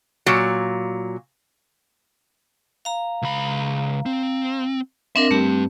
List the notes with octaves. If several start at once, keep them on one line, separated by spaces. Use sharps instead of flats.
A#2 F#3
F5 A#5
C#2 B5
C4
C4 D4 A#4 D#5 E5
G2 G3 A3 C4 G4